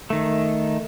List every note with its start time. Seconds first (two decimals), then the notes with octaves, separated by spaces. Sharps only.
0.10 D#3 A3